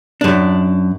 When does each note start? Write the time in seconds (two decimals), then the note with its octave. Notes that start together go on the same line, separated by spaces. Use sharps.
0.21 F#2 D4